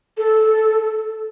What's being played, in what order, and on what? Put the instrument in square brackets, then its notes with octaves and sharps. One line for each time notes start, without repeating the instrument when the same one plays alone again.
[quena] A4